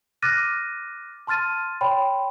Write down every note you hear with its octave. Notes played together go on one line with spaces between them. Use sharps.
D6 F6 F#6 A6 A#6 D#7
A5 C6 F6 A6 D#7
C#5 G5 B5 C6